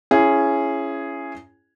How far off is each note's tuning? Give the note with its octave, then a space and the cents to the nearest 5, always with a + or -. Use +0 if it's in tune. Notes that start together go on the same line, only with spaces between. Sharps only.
C#4 +0 E4 +30 G#4 +0